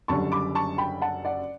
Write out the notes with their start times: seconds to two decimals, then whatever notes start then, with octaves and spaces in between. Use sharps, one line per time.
0.08 F#1 F#2 D3 G3 D4 A5 C#6
0.32 B5 D6
0.55 A5 C#6
0.78 G5 B5
1.02 F#5 A5
1.25 D5 F#5